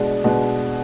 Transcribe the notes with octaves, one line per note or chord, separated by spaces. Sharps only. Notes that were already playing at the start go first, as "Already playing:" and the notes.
Already playing: B2 G#3 D4
B2 G#3 D4